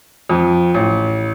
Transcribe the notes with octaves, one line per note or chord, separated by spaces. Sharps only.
F2
A1